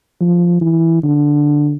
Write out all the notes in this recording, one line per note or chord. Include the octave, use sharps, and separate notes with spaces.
F3
E3
D3